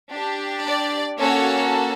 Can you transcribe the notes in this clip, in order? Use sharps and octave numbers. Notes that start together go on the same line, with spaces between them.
D4 G4
D5
A#3 C#4 F#4 A4 C#5